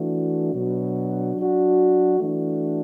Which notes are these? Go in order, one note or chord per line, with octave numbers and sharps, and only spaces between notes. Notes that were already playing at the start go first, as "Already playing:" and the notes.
Already playing: E3 A3 D4 F#4
B2 F#3 D4 F#4
F#3 D4 F#4
E3 A3 D4 F#4